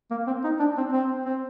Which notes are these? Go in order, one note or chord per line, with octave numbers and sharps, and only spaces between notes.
A#3
C4
D#4
D4
C4
C4
C4